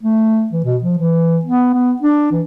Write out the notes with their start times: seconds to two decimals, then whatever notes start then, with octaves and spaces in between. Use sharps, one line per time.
0.03 A3
0.53 E3
0.65 B2
0.84 F3
0.99 E3
1.46 B3
1.74 B3
2.02 D4
2.32 E3